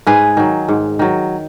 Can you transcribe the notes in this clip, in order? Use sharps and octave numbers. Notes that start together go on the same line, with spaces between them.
G#2 G#4 B4
D#3 F#3
G#2
D#3 F#3